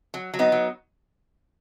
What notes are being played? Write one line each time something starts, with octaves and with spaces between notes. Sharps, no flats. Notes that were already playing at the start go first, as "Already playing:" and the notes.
F#3
F#3
B3 D#4
F#3